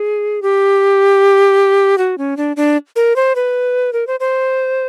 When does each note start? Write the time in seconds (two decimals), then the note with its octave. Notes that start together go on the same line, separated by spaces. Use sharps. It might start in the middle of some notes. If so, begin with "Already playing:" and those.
Already playing: G#4
0.42 G4
1.98 F#4
2.18 C#4
2.37 D4
2.56 D4
2.96 A#4
3.16 C5
3.36 B4
3.93 A#4
4.07 C5
4.20 C5